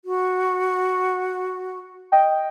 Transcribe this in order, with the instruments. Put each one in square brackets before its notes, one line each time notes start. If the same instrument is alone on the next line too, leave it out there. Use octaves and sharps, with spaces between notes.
[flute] F#4
[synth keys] D#5 G5